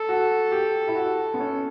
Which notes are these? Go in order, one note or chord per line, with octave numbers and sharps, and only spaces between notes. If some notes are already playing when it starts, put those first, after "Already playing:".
Already playing: A4
F#4
G4
E4
F#4
B3
C#4